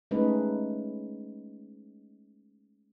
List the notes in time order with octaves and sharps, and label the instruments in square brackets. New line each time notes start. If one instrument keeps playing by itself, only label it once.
[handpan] G#3 A3 C#4 D#4 B4